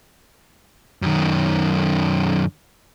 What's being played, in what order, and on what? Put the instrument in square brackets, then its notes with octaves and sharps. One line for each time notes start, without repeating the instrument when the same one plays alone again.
[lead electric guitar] F#2 D#3